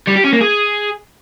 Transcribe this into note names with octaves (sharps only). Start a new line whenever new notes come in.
G3
G4
C#4
A#3
G#4